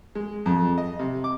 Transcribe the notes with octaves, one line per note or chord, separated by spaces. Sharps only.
G#3
F2
D#5
C3
D6